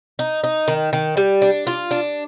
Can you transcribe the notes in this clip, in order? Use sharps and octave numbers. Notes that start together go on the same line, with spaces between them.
D#4
D#4
D#3
D#3
G3
D4
F4
D4